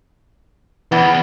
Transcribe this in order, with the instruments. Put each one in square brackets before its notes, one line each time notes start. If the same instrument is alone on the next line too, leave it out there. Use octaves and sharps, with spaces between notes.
[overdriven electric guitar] E2 [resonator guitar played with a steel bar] E3 B3